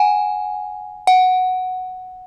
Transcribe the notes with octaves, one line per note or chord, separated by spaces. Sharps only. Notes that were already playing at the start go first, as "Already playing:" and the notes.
Already playing: F#5 G#5
F#5